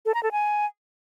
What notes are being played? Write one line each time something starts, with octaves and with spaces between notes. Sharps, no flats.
A4
A#5
A4
G#5